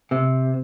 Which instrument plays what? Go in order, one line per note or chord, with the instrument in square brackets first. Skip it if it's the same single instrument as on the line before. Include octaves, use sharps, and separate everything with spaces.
[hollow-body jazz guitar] C3